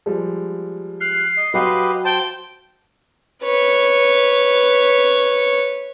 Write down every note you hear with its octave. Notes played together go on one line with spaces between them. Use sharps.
F3 G3 G#3
F6 F#6 C7
D#5
F#3 G4 B4 D#5 F5 C6
C5 G5 A5
B4 C#5